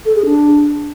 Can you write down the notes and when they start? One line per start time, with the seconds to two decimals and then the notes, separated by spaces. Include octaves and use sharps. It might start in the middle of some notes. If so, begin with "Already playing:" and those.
0.06 A4
0.16 G#4
0.26 D4